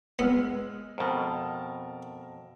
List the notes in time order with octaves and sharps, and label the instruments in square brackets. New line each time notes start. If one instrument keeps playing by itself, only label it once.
[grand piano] G#3 E6 F6 [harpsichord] B3
[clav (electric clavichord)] F2 B2 [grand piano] A#4 A5 F6